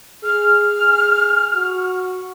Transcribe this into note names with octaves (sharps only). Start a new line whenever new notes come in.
G#4 F6
F#4